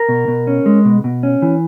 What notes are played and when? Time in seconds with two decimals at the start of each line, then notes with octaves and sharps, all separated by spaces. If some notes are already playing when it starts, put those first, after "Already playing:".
Already playing: A#4
0.09 B2
0.28 B2
0.47 C#4
0.66 G#3
0.85 B2
1.04 B2
1.23 C#4
1.42 E3